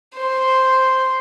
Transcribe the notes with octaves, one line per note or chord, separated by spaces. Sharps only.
C5